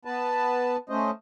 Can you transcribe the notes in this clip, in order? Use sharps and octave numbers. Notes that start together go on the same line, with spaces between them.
B3 B4 A5
A3 C#4 C5 D#5